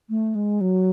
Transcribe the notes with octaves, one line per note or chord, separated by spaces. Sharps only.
A3
G#3
F#3